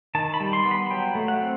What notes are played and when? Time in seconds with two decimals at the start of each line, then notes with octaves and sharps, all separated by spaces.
0.15 D#3 A5
0.34 B5
0.40 G3
0.53 C6
0.65 B3
0.71 B5
0.91 F#3 G5
1.15 A3
1.28 F#5
1.41 C4